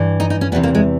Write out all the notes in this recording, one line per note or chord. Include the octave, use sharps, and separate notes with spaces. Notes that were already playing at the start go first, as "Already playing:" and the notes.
Already playing: G2 E3
D#4
D#4
C#4
E2 C3 E3 B3
A#3
G#3